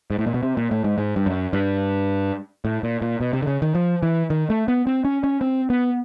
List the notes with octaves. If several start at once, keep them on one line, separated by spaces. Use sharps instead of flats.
G#2
A2
A#2
B2
C3
A#2
A2
G#2
G#2
G2
F#2
G2
A2
A#2
A#2
B2
C3
D3
C#3
D#3
F3
E3
D#3
A3
B3
C4
C#4
C#4
C4
B3